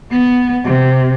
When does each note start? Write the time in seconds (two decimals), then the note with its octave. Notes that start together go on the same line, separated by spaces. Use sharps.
0.11 B3
0.64 C3